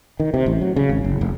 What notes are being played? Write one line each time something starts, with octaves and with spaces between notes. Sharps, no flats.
D#3
C3
A1
F#3
C#3
G#1
F#1
F1